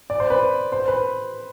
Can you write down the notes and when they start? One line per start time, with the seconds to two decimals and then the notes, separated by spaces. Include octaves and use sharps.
0.10 D5
0.20 C5
0.30 B4
0.72 C5
0.88 B4